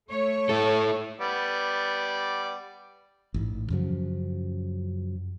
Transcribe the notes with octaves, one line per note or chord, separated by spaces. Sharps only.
A3 C#5
E4 A4
G3 B3 D5
A1 G#2
F#2 C#3 F3 F#3